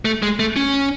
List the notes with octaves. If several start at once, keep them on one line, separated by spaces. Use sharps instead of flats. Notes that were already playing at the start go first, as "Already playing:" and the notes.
A3
G#3
A3
C#4